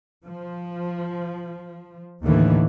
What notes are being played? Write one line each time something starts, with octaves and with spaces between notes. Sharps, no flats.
F3
D#2 A2 D3 E3